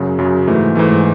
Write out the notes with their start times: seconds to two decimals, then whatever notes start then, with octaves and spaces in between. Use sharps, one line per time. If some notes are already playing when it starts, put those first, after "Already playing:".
Already playing: F#2 C#3 F#3
0.19 F#2 C#3 F#3
0.47 G#2 E3 A3
0.75 G#2 E3 A3